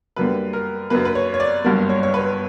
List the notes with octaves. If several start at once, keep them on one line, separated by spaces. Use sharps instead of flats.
F#2 D3 G3 A#3 B4
A#4
F#2 D3 A#3 B4
B4
C#5
C#5
D5
G1 G2 F#3 A#3
C#5
C#5
B4